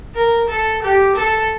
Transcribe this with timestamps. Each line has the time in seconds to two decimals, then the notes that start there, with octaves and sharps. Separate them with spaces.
0.14 A#4
0.49 A4
0.83 G4
1.16 A4